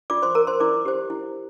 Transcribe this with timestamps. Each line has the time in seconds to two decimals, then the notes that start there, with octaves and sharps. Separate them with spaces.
0.10 F4 D5 D6
0.22 C5 C6
0.35 A#4 A#5
0.47 C5 C6
0.60 E4 D5 D6
0.85 G4 C5
1.10 E4